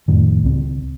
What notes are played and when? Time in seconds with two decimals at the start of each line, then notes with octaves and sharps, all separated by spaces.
0.08 F2 A2 D#3
0.44 C#2 C4